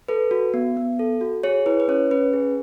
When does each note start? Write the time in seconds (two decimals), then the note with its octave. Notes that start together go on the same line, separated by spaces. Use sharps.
0.08 A4 B4
0.31 F#4
0.54 B3
0.77 B3
0.99 A4
1.21 F#4
1.44 G#4 C#5
1.66 E4 B4
1.80 B4
1.88 C#4 C#5
2.11 C#4 B4
2.33 G#4